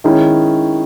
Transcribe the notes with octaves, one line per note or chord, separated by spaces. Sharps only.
D#3 G#3 C#4 E4